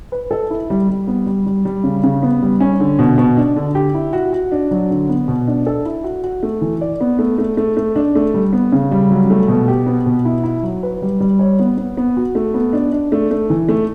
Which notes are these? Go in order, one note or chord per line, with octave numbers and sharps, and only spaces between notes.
B4
A4
E4
G3
G3
B3
G3
G3
G3
C#3
C#3
B3
G3
C#4
D3
B2
B2
D4
D3
G4
E4
F#4
F#4
D4
F#3
D3
B3
B2
D4
A4
E4
F#4
F#4
A3
E3
D5
B3
A3
A3
A3
A3
D4
A3
G3
B3
C#3
G3
F#3
A3
B2
G4
B3
B2
E4
E4
F#3
B4
G3
G3
C#5
B3
B3
B3
F#4
A3
B3
D4
D4
A3
A3
E3
A3